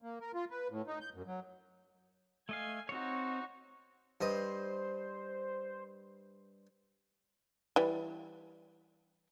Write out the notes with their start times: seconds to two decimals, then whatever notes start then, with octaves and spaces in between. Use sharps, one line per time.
0.02 A#3
0.21 A#4
0.34 F4
0.51 B4
0.70 A2
0.87 D#4
1.01 G6
1.14 F#2
1.26 F#3
2.49 A3 D#5 F5 G#5
2.89 C4 D#4 F#4 C#5
4.21 G2 C5 D#5
7.76 E3 G3